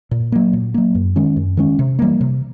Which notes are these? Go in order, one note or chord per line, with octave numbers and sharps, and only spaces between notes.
A#2
F#3 A#3
A#2
F#3 A#3
F#2
D#3 G#3 C#4
F#2
D#3 G#3 C#4
C3
E3 G3 A#3
C3